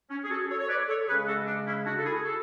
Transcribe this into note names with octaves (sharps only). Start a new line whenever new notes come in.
C#4
G#4
F#4 A4
A4 C#5
C#5
B4 D5
A4 C#5
C#3 G#3 C#4 G#4 B4
F#4 A4
D4
C#4 E4
D4 F#4
A4
E4 G#4
F#4 A4